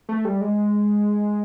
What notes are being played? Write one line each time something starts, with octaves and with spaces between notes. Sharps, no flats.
A3
G3
G#3